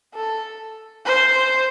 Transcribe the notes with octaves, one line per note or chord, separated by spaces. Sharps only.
A4
C5